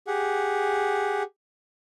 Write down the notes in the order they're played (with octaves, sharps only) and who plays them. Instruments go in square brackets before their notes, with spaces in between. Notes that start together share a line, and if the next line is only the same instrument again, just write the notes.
[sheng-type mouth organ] G4 G#4 F#5